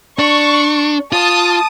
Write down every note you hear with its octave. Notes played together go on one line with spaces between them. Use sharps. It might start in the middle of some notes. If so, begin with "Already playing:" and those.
D4 C#6
F4 A5 D#6